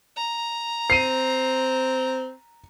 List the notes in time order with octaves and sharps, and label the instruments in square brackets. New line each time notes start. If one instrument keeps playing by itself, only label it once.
[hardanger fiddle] A#5
[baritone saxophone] C4 [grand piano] C7 D#7